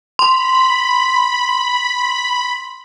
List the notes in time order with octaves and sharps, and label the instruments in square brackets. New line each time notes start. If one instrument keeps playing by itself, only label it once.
[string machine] B5 [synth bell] C6